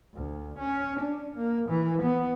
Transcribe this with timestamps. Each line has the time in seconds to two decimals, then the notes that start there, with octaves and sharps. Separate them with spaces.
0.14 D2
0.58 C#4
1.00 D4
1.35 A#3
1.70 E3
2.03 B3